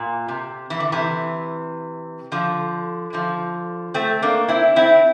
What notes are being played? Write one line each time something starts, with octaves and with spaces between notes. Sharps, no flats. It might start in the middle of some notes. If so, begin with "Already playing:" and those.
Already playing: A#2
C3
E3
D3
C3 E3
D3 F3
D3 F3
A3 C4
A#3 D4
C4 E4
C4 E4